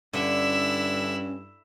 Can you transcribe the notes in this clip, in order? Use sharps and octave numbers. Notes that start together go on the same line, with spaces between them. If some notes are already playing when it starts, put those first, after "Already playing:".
G2 D3 C#4 E4 E5